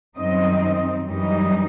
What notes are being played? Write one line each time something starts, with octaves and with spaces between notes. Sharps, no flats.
F#2 D#3 G3 C4 D#4 D#5
F#2 E3 G3 D#4